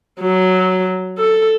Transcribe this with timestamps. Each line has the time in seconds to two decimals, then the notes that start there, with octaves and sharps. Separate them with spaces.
0.21 F#3
1.18 A4